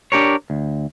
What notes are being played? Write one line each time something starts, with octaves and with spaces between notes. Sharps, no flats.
D4 G4 A#4 C#5
D2